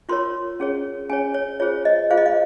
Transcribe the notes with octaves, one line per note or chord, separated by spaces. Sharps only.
F4 A#4 C#5 C6
C#4 G#4 C#5
C#4 G#4 C#5 G#5
C#5
F4 G#4 C5 C#5
D#5
F4 G#4 C5 F5
D#5
F5